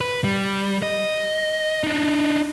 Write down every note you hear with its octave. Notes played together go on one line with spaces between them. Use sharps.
B4
G3
D#5
D4 D#4